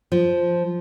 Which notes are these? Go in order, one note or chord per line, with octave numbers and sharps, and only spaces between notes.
F3